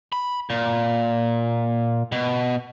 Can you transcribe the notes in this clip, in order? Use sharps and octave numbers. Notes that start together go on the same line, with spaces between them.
B5
A#2
B2